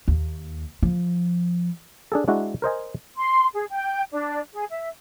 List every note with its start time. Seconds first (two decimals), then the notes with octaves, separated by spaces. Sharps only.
0.08 D#2
0.82 F3
2.12 D4 G#4 A4
2.28 G#3 D4 E4 F#4
2.62 A#4 C5 D#5 G#5
3.17 C6
3.54 G#4
3.71 G5
4.12 D4
4.54 G#4
4.70 E5